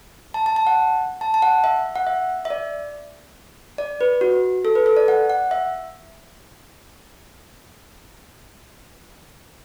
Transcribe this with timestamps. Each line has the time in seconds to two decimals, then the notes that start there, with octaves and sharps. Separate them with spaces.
0.34 A5
0.46 A5
0.56 A5
0.67 F#5
1.21 A5
1.34 A5
1.42 F#5
1.64 E5
1.95 F#5
2.07 E5
2.45 E5
2.50 D5
3.78 D5
4.01 B4
4.21 F#4
4.65 A4
4.75 B4
4.86 A4
4.97 D5
5.08 F#5
5.30 F#5
5.51 E5